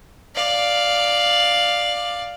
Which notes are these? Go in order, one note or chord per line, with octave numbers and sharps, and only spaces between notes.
D5 F5